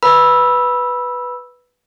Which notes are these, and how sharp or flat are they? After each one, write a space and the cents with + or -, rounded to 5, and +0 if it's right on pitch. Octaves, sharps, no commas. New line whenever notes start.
B4 +0 B5 -15 E6 +0